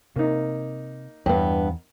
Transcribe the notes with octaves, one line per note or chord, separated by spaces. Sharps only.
C3 A#3 D#4
E2 G2 B3